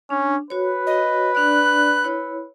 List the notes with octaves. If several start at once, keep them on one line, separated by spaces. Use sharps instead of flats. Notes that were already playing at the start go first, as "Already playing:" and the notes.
C#4 D4
F#4 B4 C#5
D#5
D4 D5 F#6
E4 C#5